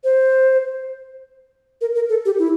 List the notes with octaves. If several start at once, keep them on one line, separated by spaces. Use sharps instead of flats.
C5
A#4
A#4
A4
G4
E4